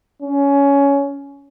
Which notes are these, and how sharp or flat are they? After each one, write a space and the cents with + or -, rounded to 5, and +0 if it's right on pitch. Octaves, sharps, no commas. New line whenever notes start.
C#4 +15